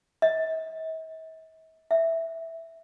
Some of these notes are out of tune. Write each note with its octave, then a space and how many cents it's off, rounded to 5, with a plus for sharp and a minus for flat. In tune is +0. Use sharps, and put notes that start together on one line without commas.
E5 -45
E5 -5